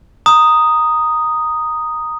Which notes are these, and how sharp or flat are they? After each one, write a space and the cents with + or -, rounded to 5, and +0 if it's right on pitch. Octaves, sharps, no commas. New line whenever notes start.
A#5 +0 D#6 +0